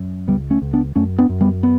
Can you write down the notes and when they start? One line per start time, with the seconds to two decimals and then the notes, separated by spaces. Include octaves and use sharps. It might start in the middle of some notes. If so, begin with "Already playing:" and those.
Already playing: F#2
0.28 C#2 G3 B3
0.50 A3 C#4
0.62 C#2
0.73 B3 D4
0.96 F#2 A3 C#4
1.18 B3 D4
1.29 F#2
1.41 G3 B3
1.63 B3